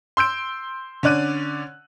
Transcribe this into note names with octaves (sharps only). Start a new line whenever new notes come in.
C6 E6 G6 D7
D3 C#4 D5 F#6 D#7